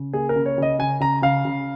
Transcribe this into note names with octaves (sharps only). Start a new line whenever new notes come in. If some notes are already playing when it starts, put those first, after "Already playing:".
Already playing: C#3
A#3 G#4
A#4
C#3
C#5
C#3 D#5
C#3 G#5
C#3 A#5
C#3 F5
C#3